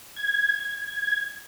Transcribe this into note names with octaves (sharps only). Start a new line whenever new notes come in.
G#6